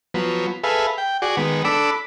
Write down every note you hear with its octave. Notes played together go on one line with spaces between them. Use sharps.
F3 F#3 B3
G#4 A4 B4 E5 F5
G5
F#4 G#4 D5
D#3 G#3 B3
D4 A4 B5 D6 E6